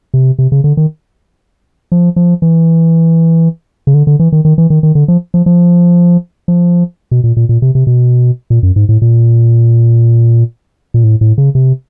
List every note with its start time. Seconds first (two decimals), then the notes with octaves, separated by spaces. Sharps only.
0.14 C3
0.39 C3
0.52 C#3
0.64 D3
0.77 D#3
1.92 F3
2.16 F3
2.42 E3
3.87 C#3
3.94 D3
4.07 D3
4.20 E3
4.32 D#3
4.45 D#3
4.58 E3
4.70 D#3
4.83 D#3
4.95 D3
5.08 F3
5.34 F3
5.46 F3
6.48 F3
7.11 B2
7.24 A#2
7.37 A#2
7.49 A#2
7.62 C3
7.75 C3
7.87 B2
8.50 A#2
8.63 F#2
8.76 G#2
8.89 A2
9.02 A#2
10.94 A#2
11.04 A2
11.21 A2
11.38 C#3
11.55 C3